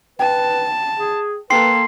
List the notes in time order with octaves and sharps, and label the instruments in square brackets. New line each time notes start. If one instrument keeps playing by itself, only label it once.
[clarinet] B4 [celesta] G5 [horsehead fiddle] A5
[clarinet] G#4
[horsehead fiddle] A#3 A4 [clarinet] B4 [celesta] G5 [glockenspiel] C6 C7